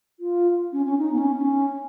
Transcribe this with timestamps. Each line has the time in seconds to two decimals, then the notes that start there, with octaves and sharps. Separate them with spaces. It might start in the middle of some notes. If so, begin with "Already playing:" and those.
0.19 F4
0.72 C#4
0.85 C#4
0.98 D#4
1.12 B3
1.17 C#4
1.37 C#4